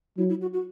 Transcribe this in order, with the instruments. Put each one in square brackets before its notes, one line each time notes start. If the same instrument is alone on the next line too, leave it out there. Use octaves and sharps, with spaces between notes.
[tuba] F#3 [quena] E4
[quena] E4
F#4
F#4